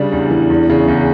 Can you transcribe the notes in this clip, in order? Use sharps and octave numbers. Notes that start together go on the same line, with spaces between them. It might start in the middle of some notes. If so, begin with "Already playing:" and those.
Already playing: C#3 G3 D4
E2
E3
E2
C#3
E2